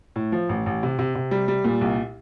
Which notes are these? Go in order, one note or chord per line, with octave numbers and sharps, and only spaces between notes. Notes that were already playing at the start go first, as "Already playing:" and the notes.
A2
F3
A1
A1
C3
C3
C3
G3
G3
A#2
C2